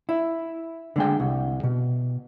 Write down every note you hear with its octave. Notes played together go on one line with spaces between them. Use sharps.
E4
D3 G#3 G5
C2
B2